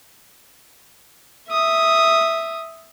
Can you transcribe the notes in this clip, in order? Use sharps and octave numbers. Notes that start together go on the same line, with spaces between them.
E5 D#6